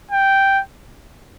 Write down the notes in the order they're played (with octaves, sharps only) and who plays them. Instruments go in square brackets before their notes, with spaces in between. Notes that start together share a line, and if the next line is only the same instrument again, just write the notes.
[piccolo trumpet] G5